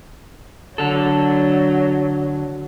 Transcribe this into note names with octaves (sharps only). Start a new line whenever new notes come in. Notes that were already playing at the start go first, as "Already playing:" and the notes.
D3 F#3 A4